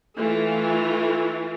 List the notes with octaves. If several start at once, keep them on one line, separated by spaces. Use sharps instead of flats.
E3 A3 F4